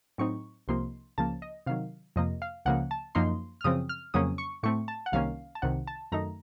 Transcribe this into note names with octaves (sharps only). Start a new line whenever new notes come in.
A2 F#3 C4 D#4 C#6
C2 C3 F3 A#3 D#4 C6
C#2 C#3 F3 A#3 A5
D#5
C3 D#3 F#3 F5
F2 C3 F3 A#3 D#5
F5
C#2 C#3 F3 A#3 F#5
A5
F#2 F3 A#3 D#4 C6
F6
F#2 C#3 F3 C4 D#6
F6
F2 C#3 F#3 A#3 C#4 D#6
C#6
A2 A3 C4 C#6
A5
F#5
C2 C3 D#3 A#3 C#4 F5
A5
C2 C3 D#3 F#5
A5
F#2 D#3 A3 D#4 A#5